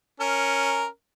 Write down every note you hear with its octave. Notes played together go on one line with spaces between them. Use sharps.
C#4 A#4